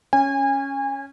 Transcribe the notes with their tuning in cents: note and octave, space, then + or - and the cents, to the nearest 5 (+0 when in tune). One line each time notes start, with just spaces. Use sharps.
C#4 +0 G#5 -30